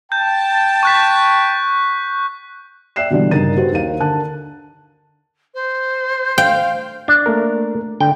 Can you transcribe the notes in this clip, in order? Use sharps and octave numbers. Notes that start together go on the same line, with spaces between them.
G5 A5 G6
C#6 F#6 B6
D5 E5 G5 F#6 C7 E7
B2 D3 E3 G3 D4
G2 C#3 D#4 A#4 A6 D#7
F#4 G4 B4 C5
D#2 D#3 A#4 F5 D#7
D3 A#4 A5 F#6
C5
F5 G5
D4
A3 A#3 A#4
D3 G5